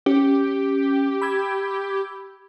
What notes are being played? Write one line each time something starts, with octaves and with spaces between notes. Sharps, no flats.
C#4 G4
B5 E6 G#6